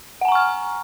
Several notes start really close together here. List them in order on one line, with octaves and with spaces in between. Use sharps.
F#5 G#5 A#5 C#6 F6